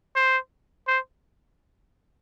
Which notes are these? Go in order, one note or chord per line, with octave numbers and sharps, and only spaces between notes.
C5
C5